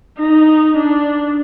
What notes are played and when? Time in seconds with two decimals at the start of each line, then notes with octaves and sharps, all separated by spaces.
0.18 D#4
0.76 D4